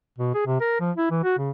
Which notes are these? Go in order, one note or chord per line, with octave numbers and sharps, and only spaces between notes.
B2
G#4
C3
A#4
F3
E4
E3
F#4
C#3